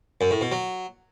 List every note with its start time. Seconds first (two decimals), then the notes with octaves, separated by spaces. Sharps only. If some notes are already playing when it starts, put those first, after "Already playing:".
0.21 F#2
0.31 A2
0.41 B2
0.52 F#3